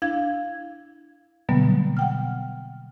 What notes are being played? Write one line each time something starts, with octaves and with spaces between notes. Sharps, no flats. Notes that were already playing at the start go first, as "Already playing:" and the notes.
D4 E4 F5 G#6
B2 D3 F#3 G3 A#3 B3
F#5 G5 F6